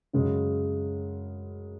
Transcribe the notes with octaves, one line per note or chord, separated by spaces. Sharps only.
F#2 C#3 G#3